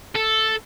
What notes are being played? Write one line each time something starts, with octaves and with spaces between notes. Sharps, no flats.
A4